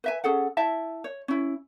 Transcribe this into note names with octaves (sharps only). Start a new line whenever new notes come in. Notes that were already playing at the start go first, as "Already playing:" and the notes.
B4 E5 G#5
C#4 G#4 A4 F#5
E4 E5 A5
C#5
C#4 E4